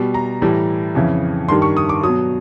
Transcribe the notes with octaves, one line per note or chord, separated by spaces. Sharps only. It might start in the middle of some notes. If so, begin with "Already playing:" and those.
Already playing: B2 G3
A#5
A2 E3 G3
F2 C#3 E3
G2 D#3 G3 C6
C#6
D#6
D6
B2 F#3 D#6